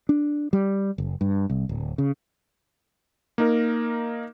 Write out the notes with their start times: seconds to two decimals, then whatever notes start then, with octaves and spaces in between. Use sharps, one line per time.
0.09 D4
0.53 G3
0.98 F#1
1.21 G2
1.50 C2
1.69 D1
1.98 C#3
3.38 A#3 D#4 A#4